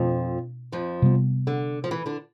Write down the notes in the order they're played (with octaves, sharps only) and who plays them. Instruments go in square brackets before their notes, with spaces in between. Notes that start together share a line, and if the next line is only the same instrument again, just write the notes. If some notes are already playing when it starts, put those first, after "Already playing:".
Already playing: [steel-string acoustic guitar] F2 F3 [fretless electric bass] B2 A3 D4
[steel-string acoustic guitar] F2 F3
[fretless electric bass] C3 G3 B3
[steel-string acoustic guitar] D3
F3
E3
D3 D4